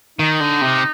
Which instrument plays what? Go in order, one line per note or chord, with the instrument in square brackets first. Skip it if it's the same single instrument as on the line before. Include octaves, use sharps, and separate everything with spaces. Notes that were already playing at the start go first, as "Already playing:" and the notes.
[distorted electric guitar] D#3 [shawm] D#4
[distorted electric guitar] D3
C3